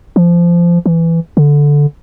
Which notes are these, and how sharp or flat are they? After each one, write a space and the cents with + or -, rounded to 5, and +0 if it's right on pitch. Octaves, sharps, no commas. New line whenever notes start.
F3 -20
E3 +10
D3 -10